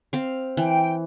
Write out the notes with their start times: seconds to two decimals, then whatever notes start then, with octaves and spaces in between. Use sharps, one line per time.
0.13 C4 F5
0.57 E3 G5